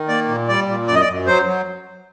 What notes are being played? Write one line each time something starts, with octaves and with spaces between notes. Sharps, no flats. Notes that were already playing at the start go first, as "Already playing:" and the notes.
Already playing: D#3
A#3 D5
A#2
G3 D5
A#2
F#2 D5
D#5
D5
F#2
F#3 C5
F#3